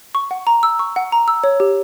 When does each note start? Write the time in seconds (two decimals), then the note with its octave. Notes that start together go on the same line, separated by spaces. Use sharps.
0.15 C#6
0.31 F#5
0.47 A#5
0.63 E6
0.79 C#6
0.96 F#5
1.12 A#5
1.28 E6
1.44 C#5
1.60 G4